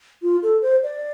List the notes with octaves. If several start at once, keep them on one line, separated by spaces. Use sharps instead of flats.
F4
A4
C5
D5